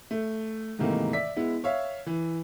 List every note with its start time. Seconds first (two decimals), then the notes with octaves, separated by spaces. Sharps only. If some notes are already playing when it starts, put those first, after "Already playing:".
0.11 A3
0.79 G#2 C3 D#3 E3 A3 A#3
1.13 D5 E5 B6
1.37 G#3 B3 E4
1.64 C#5 E5 F5
2.06 E3